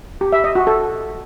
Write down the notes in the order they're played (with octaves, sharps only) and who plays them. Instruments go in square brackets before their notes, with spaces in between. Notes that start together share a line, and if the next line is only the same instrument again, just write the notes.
[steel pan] G4
E5
D#5
F#4
A4